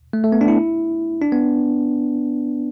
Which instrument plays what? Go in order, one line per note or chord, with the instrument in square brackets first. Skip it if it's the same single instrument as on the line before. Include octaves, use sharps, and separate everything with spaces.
[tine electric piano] A3
A3
B3
D4
E4
D4
B3